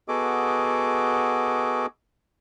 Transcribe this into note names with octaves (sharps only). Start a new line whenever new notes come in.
B3 F#4 G#4 A4 D#5 D6